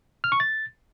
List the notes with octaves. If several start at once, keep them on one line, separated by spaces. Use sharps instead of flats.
F6
C#6
A6